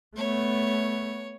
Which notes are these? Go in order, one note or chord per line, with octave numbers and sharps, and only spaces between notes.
A3 B3 C#5